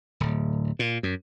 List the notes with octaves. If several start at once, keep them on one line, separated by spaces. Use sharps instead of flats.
D1
A#2
F#2